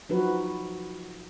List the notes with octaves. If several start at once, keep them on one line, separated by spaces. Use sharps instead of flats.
F3 F#3 D#4 F#4 B4